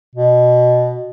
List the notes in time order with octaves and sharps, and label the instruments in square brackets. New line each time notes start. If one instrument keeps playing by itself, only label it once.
[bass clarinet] B2